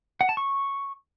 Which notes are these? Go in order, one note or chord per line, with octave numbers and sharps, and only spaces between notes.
F#5
A5
C#6